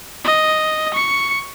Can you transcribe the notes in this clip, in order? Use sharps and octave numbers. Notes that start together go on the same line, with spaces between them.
D#5
C#6 C#7